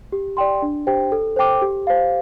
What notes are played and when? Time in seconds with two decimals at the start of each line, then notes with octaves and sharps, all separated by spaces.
0.12 G4
0.37 D5 G5 C6
0.62 D4
0.87 G4 C5 G5
1.12 A4
1.36 C5 G5 D6
1.62 G4
1.87 C5 F5